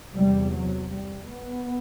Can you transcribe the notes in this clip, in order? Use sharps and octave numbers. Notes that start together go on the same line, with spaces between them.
E2 C3 G3
F#3
G3
B3